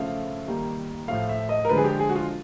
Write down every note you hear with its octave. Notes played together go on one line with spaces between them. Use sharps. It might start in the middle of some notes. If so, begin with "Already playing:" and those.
Already playing: C#3 F3 A3 F5
D#3 G3 A#3
A2 F3 A3 F5
E5
D#5
A#4
D3 F3 G#3 B4
G#4
G4
G#4
F#4
F4